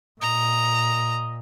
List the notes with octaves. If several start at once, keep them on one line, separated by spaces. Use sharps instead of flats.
A#2 D#5 A#5